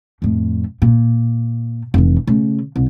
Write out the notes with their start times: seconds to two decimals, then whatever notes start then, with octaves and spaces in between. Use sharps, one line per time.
0.22 F2 A2
0.82 A#2
1.94 F1 E3
2.27 C#3 A3
2.76 C2